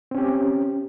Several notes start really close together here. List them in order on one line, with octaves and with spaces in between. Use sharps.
C4 C#4 G4